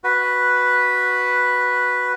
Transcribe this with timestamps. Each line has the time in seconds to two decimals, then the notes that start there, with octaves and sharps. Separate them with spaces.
0.04 F#4 B4